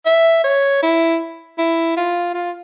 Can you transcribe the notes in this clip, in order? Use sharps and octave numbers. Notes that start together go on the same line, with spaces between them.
E5
C#5
E4
E4
F4
F4